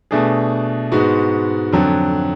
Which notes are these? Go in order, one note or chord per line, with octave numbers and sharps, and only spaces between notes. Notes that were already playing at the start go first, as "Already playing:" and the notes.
B2 A3 D4 G#4
G#2 G#3 B3 F#4
F2 D3 F#3